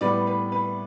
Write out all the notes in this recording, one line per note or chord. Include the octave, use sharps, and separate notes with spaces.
A2 G3 B3 B4 D5
B4
B4